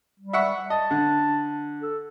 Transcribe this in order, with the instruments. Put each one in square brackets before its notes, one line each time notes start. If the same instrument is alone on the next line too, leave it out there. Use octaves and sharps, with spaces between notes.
[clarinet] G3
[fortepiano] E5 F#5 C#6
[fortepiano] D#5 [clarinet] A5
[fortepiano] D3
[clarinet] A4